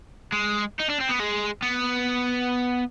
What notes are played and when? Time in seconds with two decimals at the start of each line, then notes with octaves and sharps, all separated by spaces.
0.32 G#3
0.79 D#4
0.89 D4
1.00 C4
1.09 B3
1.19 G#3
1.62 B3